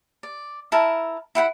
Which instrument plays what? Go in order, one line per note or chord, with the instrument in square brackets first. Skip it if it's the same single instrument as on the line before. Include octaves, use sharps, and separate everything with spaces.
[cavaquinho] D5
E4 A#4 A5
E4 F#5 G5 B5